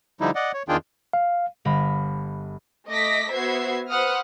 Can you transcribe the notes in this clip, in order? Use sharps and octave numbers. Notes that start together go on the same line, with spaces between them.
D3 F3 G3 D#4 E4
D5 D#5 F#5
C#5
E2 D#3 D4 F4 G#4 G5
F5
G1 F5 B5 A#6
A3 D#5 D6 A#6 B6
B3 F#4 C5 E5 G#6 C7
B4 C5 F#5 D#6 F6